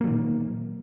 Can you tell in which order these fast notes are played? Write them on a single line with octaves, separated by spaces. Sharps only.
A#3 F#3 D#3 A#2